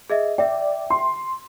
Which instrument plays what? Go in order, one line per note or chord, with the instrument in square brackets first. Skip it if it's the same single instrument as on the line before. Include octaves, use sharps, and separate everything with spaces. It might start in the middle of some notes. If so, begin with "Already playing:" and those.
[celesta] G#4 D#5 E5
[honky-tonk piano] D5 [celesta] E5 G5
[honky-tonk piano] C6